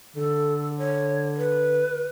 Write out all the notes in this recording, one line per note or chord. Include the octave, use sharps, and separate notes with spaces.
D3 A4
C#5
B4